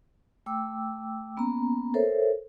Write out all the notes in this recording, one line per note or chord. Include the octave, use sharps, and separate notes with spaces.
A3 G5 D6 E6
A#3 B3 C#4 A#5
A4 A#4 C5 C#5 E5